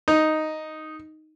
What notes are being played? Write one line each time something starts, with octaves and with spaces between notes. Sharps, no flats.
D#4